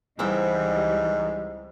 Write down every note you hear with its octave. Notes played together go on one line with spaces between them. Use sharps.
C#2 G#2 E3 G3 C4 E4 D#5